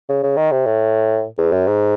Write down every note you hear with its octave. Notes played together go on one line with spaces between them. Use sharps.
C#3
C#3
D#3
C3
A2
E2
F#2
G#2